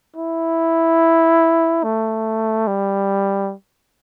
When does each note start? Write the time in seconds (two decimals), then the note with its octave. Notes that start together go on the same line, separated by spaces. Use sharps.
0.16 E4
1.84 A3
2.67 G3